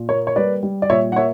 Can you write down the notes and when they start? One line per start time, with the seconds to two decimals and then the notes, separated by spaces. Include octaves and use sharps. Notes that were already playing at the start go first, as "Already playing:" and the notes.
Already playing: A#2
0.09 A#3 C#5
0.27 C#5
0.36 G3 B4 D5
0.63 G3
0.82 D5
0.89 A#2 C#5 E5
1.12 F#5
1.16 A#3 C#5 E5